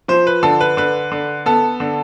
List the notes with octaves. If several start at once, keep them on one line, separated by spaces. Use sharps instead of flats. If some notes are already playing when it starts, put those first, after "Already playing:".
F3 C5
B4
D3 A4
B4
D3 B4
D3
B3 A4
D3